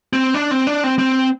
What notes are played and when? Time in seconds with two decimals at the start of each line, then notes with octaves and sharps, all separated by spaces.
0.13 C4
0.34 D4
0.51 C4
0.67 D4
0.84 C4
0.99 C4